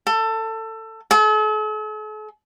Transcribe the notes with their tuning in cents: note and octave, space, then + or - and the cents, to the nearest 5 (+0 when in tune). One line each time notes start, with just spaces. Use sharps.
A4 +20
A4 -45